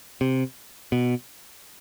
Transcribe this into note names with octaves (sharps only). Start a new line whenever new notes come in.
C3
B2